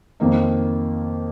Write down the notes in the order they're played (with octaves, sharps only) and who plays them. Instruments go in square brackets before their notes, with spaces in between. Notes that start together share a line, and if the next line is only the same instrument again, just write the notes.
[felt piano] F2 D#3 A#3 D#4